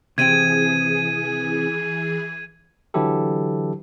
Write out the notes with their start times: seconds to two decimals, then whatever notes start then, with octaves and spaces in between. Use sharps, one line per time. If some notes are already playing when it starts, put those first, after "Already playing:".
0.18 C3 E3 C4 G#4 G5 G#6 D#7
2.94 D3 E3 F#3 E4 G4 A4